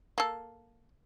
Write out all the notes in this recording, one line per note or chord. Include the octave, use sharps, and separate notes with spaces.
A#3 A4